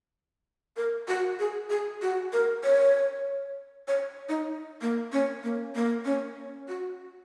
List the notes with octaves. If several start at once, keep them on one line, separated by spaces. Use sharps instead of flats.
A#4
F#4
G#4
G#4
F#4
A#4
C#5
C#5
D#4
A#3
C#4
A#3
A#3
C#4
F#4